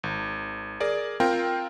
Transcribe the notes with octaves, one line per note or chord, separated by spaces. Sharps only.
G#1
G#4 A#4 D5
C4 F4 A#4 F5 G5